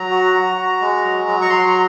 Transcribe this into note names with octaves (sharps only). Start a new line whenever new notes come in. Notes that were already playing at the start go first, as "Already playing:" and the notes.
Already playing: F#3 A#5
F#4
F#4
F#4
G#3
F#3
F#3
C#6
F#3 C6
A#5